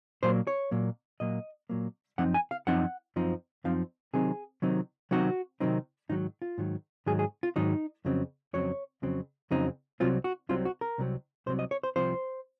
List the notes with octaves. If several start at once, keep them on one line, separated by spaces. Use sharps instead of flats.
A#2 F#3 A#3 C5
C#5
A#2 F#3 A#3
A#2 F#3 A#3 D#5
A#2 F#3 A#3
F#2 F3 C4 D#4 F#5
G#5
F5
F#2 F3 C4 D#4 F#5
F#2 F3 C4 D#4
F#2 F3 C4 D#4 F5
C3 D#3 F#3 C4 D#4 G#4
C3 D#3 F#3 C4 D#4
C3 D#3 F#3 C4 D#4 F#4
C3 D#3 F#3 C4 D#4
G#2 D#3 F#3 D#4
F4
G#2 D#3 F#3
G#2 D#3 F#3 G#4
G#4
F4
G#2 D#3 F#3 D#4
F2 C#3 F#3 C4
F2 C#3 F#3 C4 C#5
F2 C#3 F#3 C4
F2 C#3 F#3 C4 D#4
C2 C3 F#3 C4 F4
F#4
C2 C3 F#3 C4 F4
F#4
A#4
C2 C3 F#3 C4
C2 C3 F#3 C4 C5
D#5
C#5
C5
C2 C3 F3 C5